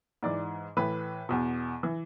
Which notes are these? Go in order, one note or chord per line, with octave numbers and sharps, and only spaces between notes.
G#2 E3 D5
A2 E3 B4
E2 B2
E3